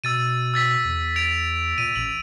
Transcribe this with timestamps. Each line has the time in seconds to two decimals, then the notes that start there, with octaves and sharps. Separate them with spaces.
0.04 B2 E6 A6 D#7
0.54 E6 A6 B6
0.84 E2
1.16 A6 D7 F7
1.78 A#2 D#7
1.96 A1 F#7